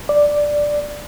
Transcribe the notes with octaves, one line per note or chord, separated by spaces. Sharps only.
D5